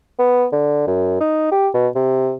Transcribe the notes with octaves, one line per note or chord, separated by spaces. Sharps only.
B3
D3
F#2
D#4
G4
B2
C3